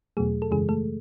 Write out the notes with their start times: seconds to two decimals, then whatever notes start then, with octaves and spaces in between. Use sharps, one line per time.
0.17 E2 B2 F#3 A3 G#4
0.42 A4
0.51 F#2 C#3 E3 G#3 G#4
0.69 A3 A4